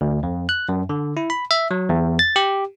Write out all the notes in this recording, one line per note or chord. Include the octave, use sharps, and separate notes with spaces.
D2
F2
F#6
F#2
D3
E4
B5
E5
F#3
E2
A6
G4